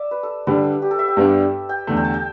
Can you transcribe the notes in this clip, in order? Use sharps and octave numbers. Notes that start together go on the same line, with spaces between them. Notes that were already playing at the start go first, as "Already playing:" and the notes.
Already playing: D5 E5
B4
A4
D3 G3 D4 B4
A4
G4
A4
E5
G5
G2 G3 B3 D4
G5
E2 D3 A3
G5
A5
G5